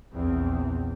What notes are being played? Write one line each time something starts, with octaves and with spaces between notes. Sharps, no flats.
A#1 E2 C4